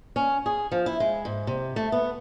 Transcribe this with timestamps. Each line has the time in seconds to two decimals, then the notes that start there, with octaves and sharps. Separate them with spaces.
0.16 C#4
0.46 G#4
0.72 F3
0.86 E4
1.00 G#3
1.25 G#2
1.47 C3
1.76 A3
1.92 B3